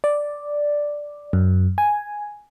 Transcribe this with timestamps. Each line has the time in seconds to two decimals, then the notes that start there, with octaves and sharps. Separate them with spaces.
0.04 D5
1.33 F#2
1.78 G#5